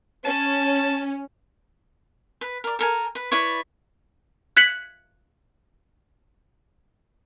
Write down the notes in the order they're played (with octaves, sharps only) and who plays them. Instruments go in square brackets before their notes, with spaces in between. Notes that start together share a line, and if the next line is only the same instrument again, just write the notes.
[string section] C#4 [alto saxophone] A5
[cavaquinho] B4
A#4 D5
A4 A#4 G#5
B4
E4 B4 C#5 D5
[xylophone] F#6 G#6 B6 C#7 F#7